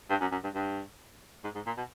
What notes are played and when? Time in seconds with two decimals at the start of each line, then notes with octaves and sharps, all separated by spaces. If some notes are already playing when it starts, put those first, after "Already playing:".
0.10 G2
0.21 F#2
0.32 F#2
0.44 G2
0.54 G2
1.44 G#2
1.55 G#2
1.66 A#2
1.77 B2